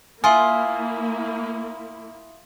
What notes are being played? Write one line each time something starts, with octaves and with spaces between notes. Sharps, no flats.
A#3 E4 F4 E5 G#5 C6 D#6